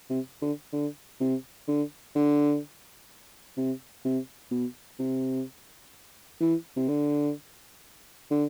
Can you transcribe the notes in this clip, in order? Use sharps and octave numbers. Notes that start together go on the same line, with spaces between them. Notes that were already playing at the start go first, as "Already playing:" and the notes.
C3
D3
D3
C3
D3
D3
C3
C3
B2
C3
E3
C3
D3
D3